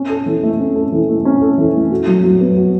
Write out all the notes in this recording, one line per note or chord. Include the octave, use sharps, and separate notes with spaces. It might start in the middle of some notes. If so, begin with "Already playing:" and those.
Already playing: C#4
A4
E3
A3
C#4
A4
E3
A3
C#4
A4
E3
A3
F#4
F#3
F#3
B3
F#4